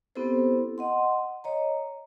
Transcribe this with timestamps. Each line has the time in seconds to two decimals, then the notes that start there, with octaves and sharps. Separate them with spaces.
0.15 B3 C4 E4 G4 A4 C5
0.78 D#5 F#5 C6
1.44 C#5 D#5 A#5